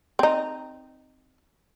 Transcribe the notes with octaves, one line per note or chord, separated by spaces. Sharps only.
C4 D#4